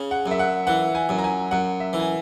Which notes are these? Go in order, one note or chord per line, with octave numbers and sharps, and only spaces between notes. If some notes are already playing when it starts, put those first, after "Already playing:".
Already playing: C#3
F#5
F#2
E5
F#5
E3 F#5
G#5
F#2
A#5
G#5
F#2 F#5
E5
E3
G#5